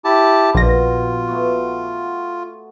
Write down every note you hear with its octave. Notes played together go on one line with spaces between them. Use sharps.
E4 G4 A5
A#1 B2 F4 A#6
A3 B3 F#4